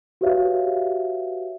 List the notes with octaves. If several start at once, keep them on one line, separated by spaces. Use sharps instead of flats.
F#4 G4 B4 C#5 E5 F5